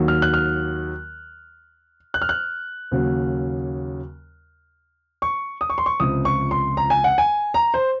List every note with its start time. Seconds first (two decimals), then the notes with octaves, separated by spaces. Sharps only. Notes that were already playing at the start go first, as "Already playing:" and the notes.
Already playing: D#2 D#3 F#3
0.08 F6
0.22 F#6
0.34 F6
2.14 F#6
2.22 F6
2.29 F#6
2.91 D#2 C#3 F#3
5.22 C#6
5.61 D#6
5.70 C#6
5.78 C6
5.86 C#6
6.00 C#2 C3 F3 D#6
6.25 C#6
6.51 C6
6.77 A#5
6.90 G#5
7.04 F#5
7.18 G#5
7.54 A#5
7.74 C5